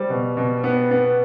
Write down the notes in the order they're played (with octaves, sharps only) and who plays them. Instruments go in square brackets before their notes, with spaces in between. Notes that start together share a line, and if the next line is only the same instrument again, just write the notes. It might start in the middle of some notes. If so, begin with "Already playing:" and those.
Already playing: [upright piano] G3 [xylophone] C5
[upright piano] B2
B2
B3
B3